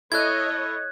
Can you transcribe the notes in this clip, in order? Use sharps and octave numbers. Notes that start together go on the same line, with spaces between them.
E4 A4 C#5 D#5 F#6 G#6